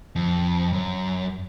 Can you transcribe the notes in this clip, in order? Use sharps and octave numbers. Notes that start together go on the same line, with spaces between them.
F2
F#2